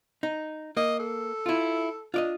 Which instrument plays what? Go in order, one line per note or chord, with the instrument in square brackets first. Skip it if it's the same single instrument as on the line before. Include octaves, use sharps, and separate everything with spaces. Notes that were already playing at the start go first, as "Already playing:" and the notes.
[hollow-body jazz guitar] D#4
[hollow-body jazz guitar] A#3 [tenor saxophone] D#5
[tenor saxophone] A4
[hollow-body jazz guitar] E4 F4
[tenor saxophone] D4 [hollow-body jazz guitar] F4 D5 D#5